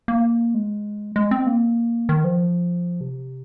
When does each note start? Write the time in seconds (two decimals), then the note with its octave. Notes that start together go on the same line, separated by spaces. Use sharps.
0.08 A#3
0.54 G#3
1.16 G#3
1.31 C4
1.47 A#3
2.09 D#3
2.24 F3
3.01 C3